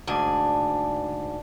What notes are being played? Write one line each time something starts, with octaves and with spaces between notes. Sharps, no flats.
D2 G#2 D4 G#5